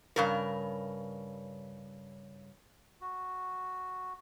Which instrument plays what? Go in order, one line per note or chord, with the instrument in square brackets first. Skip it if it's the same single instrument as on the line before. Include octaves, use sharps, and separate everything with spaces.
[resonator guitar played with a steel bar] G2 C#3 A#4
[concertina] F#4